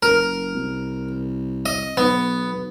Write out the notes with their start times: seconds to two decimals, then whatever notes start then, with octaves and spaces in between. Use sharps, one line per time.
0.03 F#1 A#4
0.55 C2
1.66 D#5
1.97 B1 B3